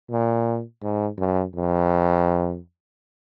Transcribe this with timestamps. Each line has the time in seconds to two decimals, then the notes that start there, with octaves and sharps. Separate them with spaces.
0.10 A#2
0.82 G#2
1.18 F#2
1.55 F2